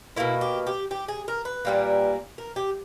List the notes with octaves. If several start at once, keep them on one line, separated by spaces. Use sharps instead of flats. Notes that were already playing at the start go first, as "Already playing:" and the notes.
B2 A#3 E4
G4
G4
G4
G#4
A#4
B4
A#2 G3 A#3
A#4
G4